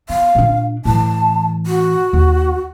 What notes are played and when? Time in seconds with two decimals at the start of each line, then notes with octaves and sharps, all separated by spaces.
0.09 B3 F5
0.35 A#2 D4
0.85 A2 E3 A5
1.67 F#4
2.13 D#2